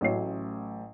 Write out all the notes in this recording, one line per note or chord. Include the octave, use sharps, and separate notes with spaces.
A1 F#3 A3 C#4 C#5 C7